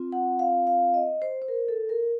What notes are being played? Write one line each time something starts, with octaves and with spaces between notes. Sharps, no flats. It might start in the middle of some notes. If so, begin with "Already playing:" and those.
Already playing: C4 F4
F#5
F5
F5
D#5
C5
C5
A#4
A4
A#4